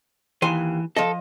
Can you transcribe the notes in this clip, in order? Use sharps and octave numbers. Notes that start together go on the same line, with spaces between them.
D#2 E3 G#5 C6
F3 A4 D#5